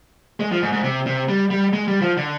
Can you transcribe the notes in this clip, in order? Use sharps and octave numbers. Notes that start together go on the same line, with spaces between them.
G#3
F3
G#2
G#2
C3
C3
G3
G3
G#3
G3
F3
D3